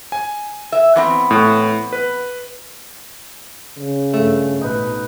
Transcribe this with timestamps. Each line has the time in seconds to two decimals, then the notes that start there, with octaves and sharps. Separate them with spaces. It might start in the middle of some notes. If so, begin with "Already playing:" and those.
0.12 G#5
0.72 E5
0.96 E3 B3 C4
1.31 A2
1.93 B4
3.77 C#3
4.14 G2 A3
4.61 A1 B2 D#4 B4